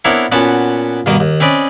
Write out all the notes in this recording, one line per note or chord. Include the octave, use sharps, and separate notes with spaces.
B3 C4 D4 E4 A#4 C#5
A#2 B3 C#4 F#4 A5
G2 B2 D#3 A#3
D#2
C4 C#4 B4 D5 D#5